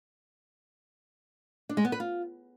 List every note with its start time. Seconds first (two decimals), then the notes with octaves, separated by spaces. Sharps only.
1.69 D4
1.77 G#3
1.85 B3
1.92 B4
2.00 F4